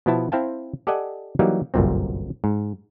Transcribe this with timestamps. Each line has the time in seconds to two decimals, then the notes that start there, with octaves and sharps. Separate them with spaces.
0.06 B2 F3 B3 E4 A5
0.32 C4 E4 C5 F5 G5 A5
0.87 G4 A4 D5 D#5 F#5 G#5
1.39 E3 F#3 G3 A#3 D#4 G4
1.74 G1 C2 F#2 A#2 C4
2.44 G#2